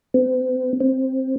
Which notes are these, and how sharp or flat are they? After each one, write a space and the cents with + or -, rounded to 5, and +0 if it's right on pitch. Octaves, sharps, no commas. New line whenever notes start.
C4 -40
C4 +10